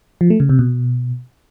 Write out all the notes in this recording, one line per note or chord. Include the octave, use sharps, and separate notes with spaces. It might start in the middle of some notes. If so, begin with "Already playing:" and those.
F3
A3
C#3
C3
B2